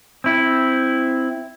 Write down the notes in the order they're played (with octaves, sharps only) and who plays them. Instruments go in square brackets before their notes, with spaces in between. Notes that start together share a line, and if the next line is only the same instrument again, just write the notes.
[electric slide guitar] C4 E4